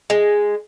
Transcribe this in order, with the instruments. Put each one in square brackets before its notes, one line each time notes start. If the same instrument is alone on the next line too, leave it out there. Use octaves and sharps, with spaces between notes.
[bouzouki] G#3